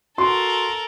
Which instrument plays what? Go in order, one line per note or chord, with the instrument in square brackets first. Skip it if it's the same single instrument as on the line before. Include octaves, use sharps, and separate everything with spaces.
[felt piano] F#4 C6 [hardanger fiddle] A4 A#4